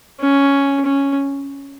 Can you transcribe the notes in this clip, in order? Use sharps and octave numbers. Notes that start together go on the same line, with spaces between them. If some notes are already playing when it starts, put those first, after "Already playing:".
C#4
C#4